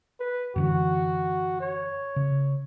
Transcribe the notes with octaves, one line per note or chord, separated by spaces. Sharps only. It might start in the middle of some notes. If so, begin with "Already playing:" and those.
B4
F#2 D3 E3 F#4
C#5
C#3